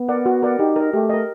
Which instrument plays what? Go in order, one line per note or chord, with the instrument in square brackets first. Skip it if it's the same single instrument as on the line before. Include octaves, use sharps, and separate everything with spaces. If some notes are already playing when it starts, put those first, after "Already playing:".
Already playing: [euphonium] B3
[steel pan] A#4 D5 F#5
F#4
A#4 D5 F#5
[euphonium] D#4 [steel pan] G4
[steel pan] A#4 D#5
[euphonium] A3 [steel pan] G4
[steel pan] A#4 D#5